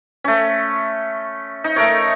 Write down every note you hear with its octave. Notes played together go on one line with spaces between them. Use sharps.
A3 C#4
D#4
A3 A#4 C#5